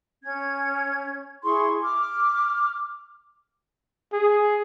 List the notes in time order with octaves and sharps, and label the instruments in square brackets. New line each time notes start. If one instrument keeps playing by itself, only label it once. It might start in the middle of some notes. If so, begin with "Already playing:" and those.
[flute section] C#4 G#6
E4 G#4 C6 C#6
D6 F6
[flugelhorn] G#4